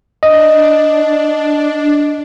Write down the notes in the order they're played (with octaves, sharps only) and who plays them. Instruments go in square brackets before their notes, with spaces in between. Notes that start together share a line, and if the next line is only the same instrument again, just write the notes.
[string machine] D4 [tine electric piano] D#5